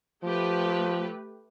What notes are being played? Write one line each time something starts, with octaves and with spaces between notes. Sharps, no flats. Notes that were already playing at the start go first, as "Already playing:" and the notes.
F3 A3 G4 B4